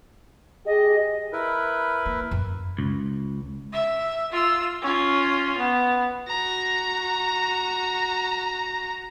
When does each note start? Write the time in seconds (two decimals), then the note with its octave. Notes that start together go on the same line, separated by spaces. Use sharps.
0.66 G4 G#4 D#5
1.33 E4 A#4 B4
2.06 A#3
2.31 F#2
2.79 C#2
3.73 E5
4.32 F4 E6
4.82 C#4 F4
5.58 B3
6.27 F#4 A#5